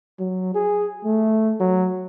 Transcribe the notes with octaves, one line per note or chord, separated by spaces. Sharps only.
F#3
G#4
A3
F#3